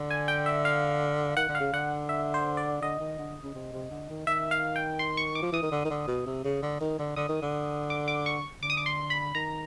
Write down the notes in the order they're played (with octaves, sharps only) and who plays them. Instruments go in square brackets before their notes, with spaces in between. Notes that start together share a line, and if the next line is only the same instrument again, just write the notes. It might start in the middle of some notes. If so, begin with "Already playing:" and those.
Already playing: [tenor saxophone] D3
[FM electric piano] G#5
G5
E5
F5
[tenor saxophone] D#3 [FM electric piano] F#5
[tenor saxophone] D3
[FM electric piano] F5
[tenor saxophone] C#3
[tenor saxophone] D3 [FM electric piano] F#5
[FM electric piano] E5
C5
D5
[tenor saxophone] D3 [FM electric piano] D#5
[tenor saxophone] D#3
D3
C#3
C3
C3
D3
D#3
[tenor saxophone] D#3 [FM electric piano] E5
[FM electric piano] F5
G5
C6
C#6
D6
[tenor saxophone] F3
[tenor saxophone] E3 [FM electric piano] D#6
[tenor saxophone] D#3
D3
D#3
D3
B2
C3
C#3
D3
D#3
D3
[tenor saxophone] D3 [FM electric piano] D#6
[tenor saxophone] D#3
D3
[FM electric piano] D6
D6
C#6
[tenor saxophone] D3 [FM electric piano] D6
[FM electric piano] D#6
D6
C6
B5
[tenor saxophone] D#3 [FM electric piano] A#5